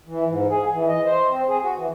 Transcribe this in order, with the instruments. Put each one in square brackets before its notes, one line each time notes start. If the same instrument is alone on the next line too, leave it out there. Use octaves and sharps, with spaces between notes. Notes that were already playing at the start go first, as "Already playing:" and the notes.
[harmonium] E3
G#2
G#4
E3
D#5
C5
C4
G#4
F#4
E3